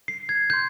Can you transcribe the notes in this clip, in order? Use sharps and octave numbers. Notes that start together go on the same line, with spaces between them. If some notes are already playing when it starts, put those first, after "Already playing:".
C7
G#6
C6 G6